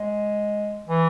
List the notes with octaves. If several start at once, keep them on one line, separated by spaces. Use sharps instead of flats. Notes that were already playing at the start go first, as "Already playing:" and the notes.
Already playing: G#3
E3